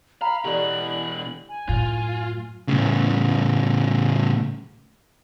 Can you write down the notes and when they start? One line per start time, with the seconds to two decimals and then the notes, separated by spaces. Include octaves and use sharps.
0.21 F5 G5 A#5 B5
0.45 B2 E3 G4 A4 D5 F#7
1.49 G#5
1.69 F#2 A2 F4
2.68 A2 C#3